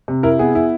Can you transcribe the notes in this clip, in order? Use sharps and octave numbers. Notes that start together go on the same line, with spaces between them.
C3
E4 A#4
B3 G#4
E4